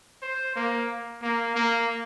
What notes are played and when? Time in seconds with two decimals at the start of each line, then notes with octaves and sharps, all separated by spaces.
0.22 C5
0.56 A#3
1.22 A#3
1.55 A#3